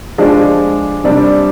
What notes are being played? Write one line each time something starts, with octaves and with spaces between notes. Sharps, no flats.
F3 G#3 D4 G4
C3 G3 D4